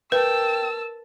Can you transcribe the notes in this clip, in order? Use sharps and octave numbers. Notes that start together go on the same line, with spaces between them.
A#4 B4 G5 A5 E6